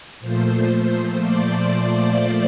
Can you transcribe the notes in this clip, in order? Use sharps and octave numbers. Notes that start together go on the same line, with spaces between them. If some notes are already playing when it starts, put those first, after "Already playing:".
A#2 F3 A3 C5
D5